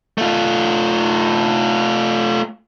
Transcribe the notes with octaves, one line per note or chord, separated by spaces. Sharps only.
A3 F4